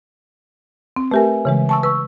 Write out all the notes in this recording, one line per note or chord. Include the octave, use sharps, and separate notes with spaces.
C4
A3 G4 A#4 B4 E5 G#5
C#3 E3 G#3
A5 C#6 E6
B4 C#6 E6